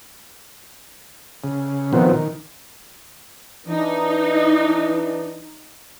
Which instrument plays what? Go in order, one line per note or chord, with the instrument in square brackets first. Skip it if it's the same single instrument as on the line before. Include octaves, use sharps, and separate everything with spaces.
[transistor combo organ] C#3
B2 D#3 F3 B3 C4
D#3
[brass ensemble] E3 D4 [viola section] D#4